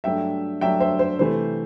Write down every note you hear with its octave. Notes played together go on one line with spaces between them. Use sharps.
G2 F#3 A3 D4 E5 G5
G2 F#3 A3 D4 E5 G5
C5 E5
C5
C3 E3 A3 C5